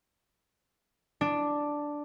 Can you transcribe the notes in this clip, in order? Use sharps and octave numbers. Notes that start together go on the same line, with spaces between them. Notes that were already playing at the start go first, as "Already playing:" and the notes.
D4